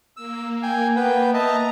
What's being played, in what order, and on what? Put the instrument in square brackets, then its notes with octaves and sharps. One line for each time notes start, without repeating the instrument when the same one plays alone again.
[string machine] A#3 [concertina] E6
[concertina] G5 G#5
B3 B4 G5
[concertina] D#5 E5 A5 [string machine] A#5